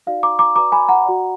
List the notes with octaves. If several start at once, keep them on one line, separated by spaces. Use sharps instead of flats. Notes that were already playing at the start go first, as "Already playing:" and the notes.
D#4 F#4 D5 F5
A#5 D6
A#5 D6
F#4 B4 D5 A#5 D6
G#5 B5
F#5 A#5
F#4 D5